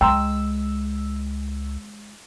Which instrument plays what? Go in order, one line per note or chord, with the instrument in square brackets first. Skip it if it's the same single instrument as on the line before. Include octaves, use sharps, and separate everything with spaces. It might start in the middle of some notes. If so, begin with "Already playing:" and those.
[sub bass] C#2 [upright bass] G#3 [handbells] G5 A#5 C6 [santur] E6